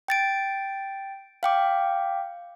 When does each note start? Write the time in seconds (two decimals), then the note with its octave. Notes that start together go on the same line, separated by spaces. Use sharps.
0.08 G5 A6 D7
1.43 F5 G5 D6